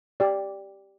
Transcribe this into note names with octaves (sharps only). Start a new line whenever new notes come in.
G4 D5